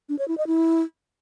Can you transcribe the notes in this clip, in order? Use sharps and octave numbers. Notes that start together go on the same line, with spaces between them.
D4
C#5
E4
D#5
E4